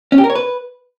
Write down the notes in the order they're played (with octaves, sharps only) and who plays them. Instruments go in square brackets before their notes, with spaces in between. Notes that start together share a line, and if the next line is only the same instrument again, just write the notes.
[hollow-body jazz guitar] C#4
G4
A#4
C#5
B4